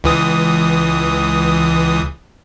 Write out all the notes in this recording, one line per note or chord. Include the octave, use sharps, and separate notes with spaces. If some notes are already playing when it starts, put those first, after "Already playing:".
C#2 E3 D#6